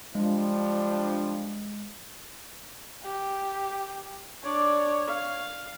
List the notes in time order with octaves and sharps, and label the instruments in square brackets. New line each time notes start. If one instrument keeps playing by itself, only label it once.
[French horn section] F3 G3 D4 [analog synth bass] G#3
[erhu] G4
[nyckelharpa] D4 D5 [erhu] C#5
[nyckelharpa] F5